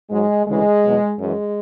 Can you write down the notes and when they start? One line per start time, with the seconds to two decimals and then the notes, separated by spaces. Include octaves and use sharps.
0.10 G#2 F#3 G#3
0.46 D2 C#3 E3 G#3
0.82 E2 B2 F#3
1.18 F#2 E3 G#3